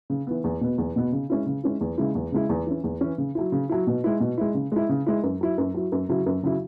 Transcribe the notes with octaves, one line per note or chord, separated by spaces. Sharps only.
C#3
E3 B3
E2
B2 B3
E2
B2 B3
C#3
G#3 C#4 E4
C#3
G#3 C#4 E4
E2
C#3 G#3 E4
E2
C#3 G#3 E4
E2
E3 C#4
E2
E3 C#4
C#3
F#3 E4
C#3
F#3 E4
B2
G#3 E4
B2
G#3 E4
C#3
G#3 E4
C#3
G#3 E4
F#2
F#3 E4
F#2
F#3 E4
F#2
C#3 F#3 E4
F#2
C#3 F#3 E4